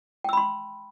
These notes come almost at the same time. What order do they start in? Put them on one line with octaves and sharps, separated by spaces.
G5 E6 B5 C6